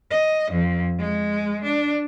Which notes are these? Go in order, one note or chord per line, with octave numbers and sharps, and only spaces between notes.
D#5
F2
G#3
D4